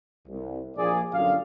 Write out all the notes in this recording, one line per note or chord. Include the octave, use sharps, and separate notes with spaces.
C2
A#1 A#3 G#4 D5
G1 F#2 A#2 D3 F4 F5